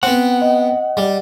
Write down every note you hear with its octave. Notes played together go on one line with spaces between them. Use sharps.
B3 C4 F#5
D#5
G3